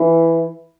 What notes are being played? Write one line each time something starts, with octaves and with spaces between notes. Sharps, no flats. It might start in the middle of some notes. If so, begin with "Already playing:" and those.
Already playing: E3 E4